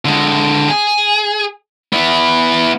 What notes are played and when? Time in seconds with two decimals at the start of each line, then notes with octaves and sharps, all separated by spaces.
0.05 D3 G#3
0.68 G#4
1.93 B3 E4